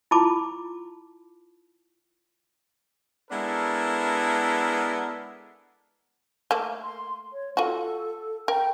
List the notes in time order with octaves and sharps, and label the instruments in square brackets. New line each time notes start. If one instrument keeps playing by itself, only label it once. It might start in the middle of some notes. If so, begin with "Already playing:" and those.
[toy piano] E4 F4 A5 B5 D6
[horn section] G#3 B3 D4 E4 A4 A#4
[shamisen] A3 A#3
[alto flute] C6
C#5
[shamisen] F4 F#4 [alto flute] A4
[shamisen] A#4 [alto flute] G5